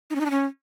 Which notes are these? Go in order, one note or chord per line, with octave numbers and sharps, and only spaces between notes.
D#4
C#4
D#4
D4
C#4